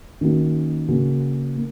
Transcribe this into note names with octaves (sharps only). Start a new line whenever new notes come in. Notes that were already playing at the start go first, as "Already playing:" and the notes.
D#3 A#3 C#4 F#4
C#3 A#3 C#4 F#4
A#3